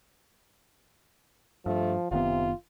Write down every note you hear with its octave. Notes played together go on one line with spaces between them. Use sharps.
G2 F3 A3
F#1 C3 D#3 B3 F4